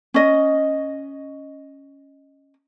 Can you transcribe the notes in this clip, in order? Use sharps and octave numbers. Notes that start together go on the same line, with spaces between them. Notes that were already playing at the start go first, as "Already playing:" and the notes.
C#4 D#5